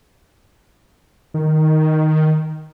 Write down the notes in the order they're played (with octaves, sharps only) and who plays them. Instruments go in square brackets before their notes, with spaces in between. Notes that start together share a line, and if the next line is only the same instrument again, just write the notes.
[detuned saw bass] D#3